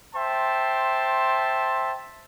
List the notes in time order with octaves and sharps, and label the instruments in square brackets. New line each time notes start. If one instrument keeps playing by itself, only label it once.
[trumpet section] C5 E5 G5 A5 C6